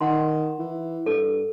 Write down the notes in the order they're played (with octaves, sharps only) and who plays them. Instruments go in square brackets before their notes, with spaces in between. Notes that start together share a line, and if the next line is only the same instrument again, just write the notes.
[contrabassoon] D#3 [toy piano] F#5 C6
[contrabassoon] E3
[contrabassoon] G2 [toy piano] A4